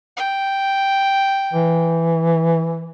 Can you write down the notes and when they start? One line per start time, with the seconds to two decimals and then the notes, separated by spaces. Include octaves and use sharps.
0.17 G5
1.54 E3